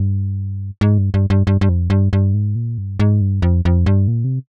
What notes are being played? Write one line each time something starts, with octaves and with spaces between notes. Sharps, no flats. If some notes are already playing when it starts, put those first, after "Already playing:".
Already playing: G2
G#2
G2
G2
G2
G2
G2
F2
G2
G2
G#2
A#2
G2
G#2
G2
F2
F2
G2
A#2
C3